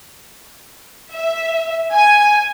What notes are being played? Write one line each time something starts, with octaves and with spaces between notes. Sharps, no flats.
E5
G#5